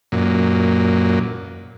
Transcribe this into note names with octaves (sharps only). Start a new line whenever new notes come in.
F#2 A#2